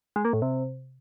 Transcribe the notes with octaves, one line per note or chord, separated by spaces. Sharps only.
G#3
A#3
A2
C3